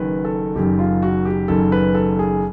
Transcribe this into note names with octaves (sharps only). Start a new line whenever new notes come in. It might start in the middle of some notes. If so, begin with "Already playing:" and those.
Already playing: F#1 F#2 D#3 B4
A4
F#1 F#2 D#3 G4
F4
F#4
G4
F#1 F#2 D#3 A4
B4
A4
G#4